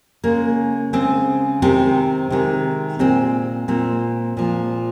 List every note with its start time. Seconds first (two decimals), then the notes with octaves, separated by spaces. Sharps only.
0.24 C#3 G#3 A#3
0.93 C#3 G#3 C4
1.62 C3 D#3 G#3 C4
2.30 C3 D#3 G#3
2.99 A#2 G#3 C4
3.68 A#2 G#3 C4
4.37 A#2 F3 G#3